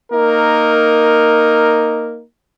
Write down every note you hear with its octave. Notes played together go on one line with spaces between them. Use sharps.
A#3 D#4 A#4